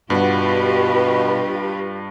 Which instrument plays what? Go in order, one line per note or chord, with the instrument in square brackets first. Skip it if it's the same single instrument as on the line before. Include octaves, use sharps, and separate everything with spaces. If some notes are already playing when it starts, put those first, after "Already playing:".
[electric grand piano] G2 [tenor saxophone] B2 [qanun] B3 D4 F#5 [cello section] F4 G4 B4